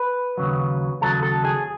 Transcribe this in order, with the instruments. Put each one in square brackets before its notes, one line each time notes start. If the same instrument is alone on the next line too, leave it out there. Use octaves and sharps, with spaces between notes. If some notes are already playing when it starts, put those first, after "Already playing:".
Already playing: [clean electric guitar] B4
D#2 C#3 F#3
D#2 C#3 F#3 A4
A4
G#4